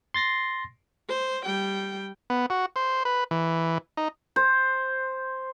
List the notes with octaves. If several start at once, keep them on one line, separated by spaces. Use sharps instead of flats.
C6 A6 A#6 C7
C5
G3 G5
B3
F#4
C5
B4
E3
D#4
C5